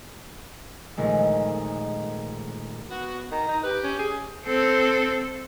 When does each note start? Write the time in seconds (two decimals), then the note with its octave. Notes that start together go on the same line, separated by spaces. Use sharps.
0.97 A#1 D#3 G#3 A3
2.89 B3 F#4
3.31 D#3 A#5
3.49 D#4
3.63 G4 B4
3.84 C#4
3.99 G#4
4.46 C4 A4